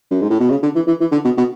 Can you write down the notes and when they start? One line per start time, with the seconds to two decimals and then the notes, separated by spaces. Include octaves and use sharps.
0.11 F#2
0.21 G#2
0.30 A2
0.40 B2
0.50 C#3
0.63 D3
0.75 E3
0.87 E3
1.00 E3
1.12 D3
1.25 B2
1.37 B2